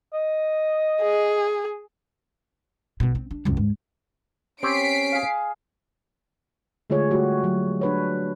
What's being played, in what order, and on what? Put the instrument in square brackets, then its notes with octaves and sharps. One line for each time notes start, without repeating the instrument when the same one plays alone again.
[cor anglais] D#5
[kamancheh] G#4
[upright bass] B1 B2
C4
D4
C#2 F#2
G#2
[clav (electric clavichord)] C4 G4 C#5 [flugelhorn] C#4 [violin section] B6 C7 D7
[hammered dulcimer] G#4 F5
[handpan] D3 G#3 A3 F4 G#4 C#5
G3 A3 F#4 G4
F#3
D4 B4 C#5